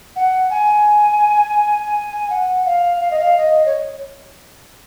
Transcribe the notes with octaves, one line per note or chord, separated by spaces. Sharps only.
F#5
G#5
F#5
F5
F5
D#5
F5
D#5
C#5